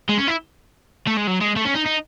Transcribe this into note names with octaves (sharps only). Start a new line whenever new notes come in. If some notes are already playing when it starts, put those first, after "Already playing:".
G#3
C#4
E4
A3
G#3
F#3
G#3
A3
C#4
D#4
D#4